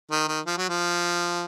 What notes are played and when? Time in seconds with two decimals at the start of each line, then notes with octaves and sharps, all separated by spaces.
0.11 D#3
0.28 D#3
0.46 F3
0.57 F#3
0.69 F3